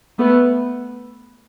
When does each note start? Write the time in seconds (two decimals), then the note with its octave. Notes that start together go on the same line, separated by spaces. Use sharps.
0.18 A3 B3